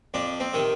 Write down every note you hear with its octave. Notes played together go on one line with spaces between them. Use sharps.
F2 D4
C4
C3 D#3